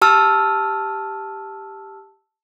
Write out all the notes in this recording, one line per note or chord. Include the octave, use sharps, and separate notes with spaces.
G4 A5 E6 F6